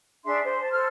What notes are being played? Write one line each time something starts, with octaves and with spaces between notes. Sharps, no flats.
D4 G#4 E5 C6
C5
A5
A4 C5 F6